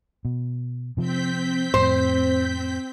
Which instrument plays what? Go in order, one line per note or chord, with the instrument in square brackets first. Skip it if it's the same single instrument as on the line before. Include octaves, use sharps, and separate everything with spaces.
[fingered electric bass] B2
[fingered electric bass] C3 F3 [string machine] C4 G6 B6
[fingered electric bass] F2 A2 [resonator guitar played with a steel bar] C5